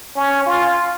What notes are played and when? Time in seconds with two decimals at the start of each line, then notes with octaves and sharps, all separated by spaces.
0.16 C#4
0.46 F4